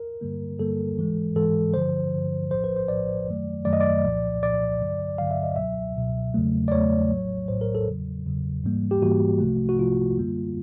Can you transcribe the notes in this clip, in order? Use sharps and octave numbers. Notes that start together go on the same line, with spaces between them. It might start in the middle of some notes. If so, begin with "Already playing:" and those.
Already playing: A#4
G2 D3 G3 A#3
G2 D3 G3 A#3 A4
G#2 E3 G#3
G#2 E3 G#3 A4
G2 D3 F3 C5
G2 D3 F3
A#1 A2 F3 C5
B4
C5
A#1 A2 F3 D5
F#2 D#3 F#3 A3
F#2 D#3 F#3 A3 D5
D#5
D5
C2 A#2 F3
C2 A#2 F3 D5
G2 D3 F#3
G2 D3 F#3 F5
E5
D#5
C#2 B2 F#3 E5
C#2 B2 F#3
E2 C#3 F#3 A3
D5
E2 C#3 F#3 A3 C#5
A#1 A2 F#3
A#1 A2 F#3 C5
A#4
A4
E2 C#3 F#3
E2 C#3 F#3
G#2 E3 G3 A#3
G4
G#2 E3 G3 A#3 F#4
C2 C3 F3 A3
F#4
C2 C3 F3 A3 F4
F#2 D3 G3 A#3